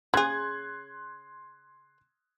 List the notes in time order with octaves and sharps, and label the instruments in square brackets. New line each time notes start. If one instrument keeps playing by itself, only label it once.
[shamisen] C#3 G#4 [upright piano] C6 F#6 G#6